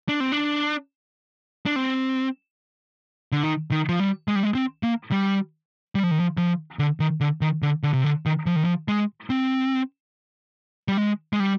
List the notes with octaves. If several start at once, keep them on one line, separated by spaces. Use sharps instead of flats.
D4
C4
D4
D4
C4
D3
D#3
D#3
F3
G3
G#3
G3
G#3
C4
A#3
G3
G3
F3
D#3
F3
F3
D3
D#3
D3
D#3
D3
D3
C3
D3
D#3
F3
D#3
F3
G#3
C4
G3
G#3
G#3
G3